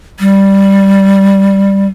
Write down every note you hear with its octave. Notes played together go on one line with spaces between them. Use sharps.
G3